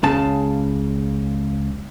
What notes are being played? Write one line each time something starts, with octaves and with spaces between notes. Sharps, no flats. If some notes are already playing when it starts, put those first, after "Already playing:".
C#2 C#3 A5